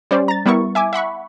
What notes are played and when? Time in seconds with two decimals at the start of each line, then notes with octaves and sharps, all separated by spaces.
0.11 G3 C#4 C5 D5
0.28 A#5 A6
0.46 G3 B3 E4 A#4 C#6
0.75 E5 G#5 D6
0.93 E5 F#5 B5 C#6